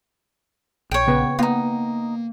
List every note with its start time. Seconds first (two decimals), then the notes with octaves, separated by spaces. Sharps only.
0.91 A#1 C#5 G5
1.07 C#3 B3 B4
1.39 A#3 B3 D#4 F4